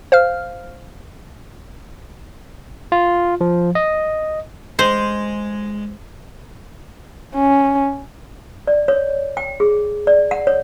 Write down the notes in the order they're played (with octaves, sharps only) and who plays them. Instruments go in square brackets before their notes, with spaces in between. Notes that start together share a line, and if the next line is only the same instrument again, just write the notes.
[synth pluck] C5 F5 F6
[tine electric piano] F4
F3
D#5
[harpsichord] G#3 [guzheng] C5
[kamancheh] C#4
[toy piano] D5
C#5
G5
G#4
D5
F#5
C#5